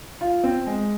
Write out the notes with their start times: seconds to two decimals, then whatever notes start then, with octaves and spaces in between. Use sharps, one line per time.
0.21 F4
0.44 C4
0.67 G#3